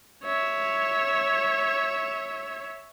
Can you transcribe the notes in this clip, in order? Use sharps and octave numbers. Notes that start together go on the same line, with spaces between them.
C#5 E5